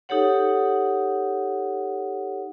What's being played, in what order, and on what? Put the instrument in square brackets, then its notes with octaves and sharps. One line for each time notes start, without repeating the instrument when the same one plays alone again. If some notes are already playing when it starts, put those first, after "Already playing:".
[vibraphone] D#4 G4 A4 C#5 F#5